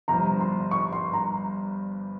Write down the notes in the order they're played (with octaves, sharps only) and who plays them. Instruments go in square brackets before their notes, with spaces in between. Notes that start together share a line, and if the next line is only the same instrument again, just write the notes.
[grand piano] G1 G2 F3 [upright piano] A#5
[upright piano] C6
C#6
C6
A#5